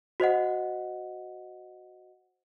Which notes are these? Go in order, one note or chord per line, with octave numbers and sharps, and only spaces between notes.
F#4 C5 D#5 F#5